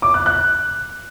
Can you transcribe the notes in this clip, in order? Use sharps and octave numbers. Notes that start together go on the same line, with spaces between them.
D6
F#6
F#6